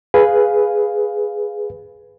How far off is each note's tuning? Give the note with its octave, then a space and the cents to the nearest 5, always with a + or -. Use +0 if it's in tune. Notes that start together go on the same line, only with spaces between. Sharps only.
G#4 +0 B4 +0 F5 +0